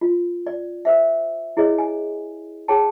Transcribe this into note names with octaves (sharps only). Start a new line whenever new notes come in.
F4
D5
A#4 C5 E5
E4 G#4 C#5 D#5
G#5
G#4 C#5 G5 A5